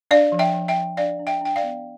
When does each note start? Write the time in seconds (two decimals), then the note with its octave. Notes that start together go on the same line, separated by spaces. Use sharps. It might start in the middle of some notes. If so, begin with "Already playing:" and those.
0.11 D4 D5 F5
0.32 F3
0.39 E5 G5
0.54 F3
0.68 E5 G5
0.76 F3
0.97 D4 D5 F5
1.20 D4
1.27 E5 G5
1.41 D4 G5
1.56 D5 F5
1.63 B3